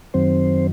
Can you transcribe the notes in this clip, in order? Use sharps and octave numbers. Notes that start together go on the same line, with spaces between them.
F#2 D#3 F#3 C4 C5